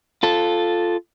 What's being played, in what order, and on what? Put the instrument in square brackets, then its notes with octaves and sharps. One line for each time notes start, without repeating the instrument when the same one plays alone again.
[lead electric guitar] F4 A4